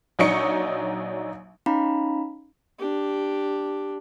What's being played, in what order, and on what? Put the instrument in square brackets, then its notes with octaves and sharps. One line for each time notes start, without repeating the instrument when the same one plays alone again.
[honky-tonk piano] A#1 F#3 D4 D#4 C#6 C#7
[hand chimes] C#4 D#4 F5 A#5 B5
[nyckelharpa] D4 G4